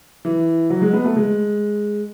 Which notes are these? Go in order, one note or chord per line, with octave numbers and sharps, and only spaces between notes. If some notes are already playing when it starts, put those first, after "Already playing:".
E3
F#3
G#3
B3
A3
G#3